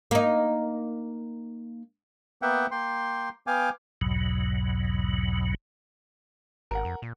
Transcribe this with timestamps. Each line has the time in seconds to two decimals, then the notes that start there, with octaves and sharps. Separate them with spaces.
0.11 A#3 D#4
2.42 A#3 B3 E5 F#5 G5
2.71 A#3 G5 C6
3.47 B3 F5 G5 G#5 D6
4.01 B1 E2 G#2 B2 F#3
6.71 G#1 A#4 F#5
6.85 F2
7.02 A#2